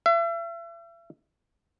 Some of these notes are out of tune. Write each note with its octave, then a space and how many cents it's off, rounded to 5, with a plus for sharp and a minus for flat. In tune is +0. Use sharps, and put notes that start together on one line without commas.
E5 +40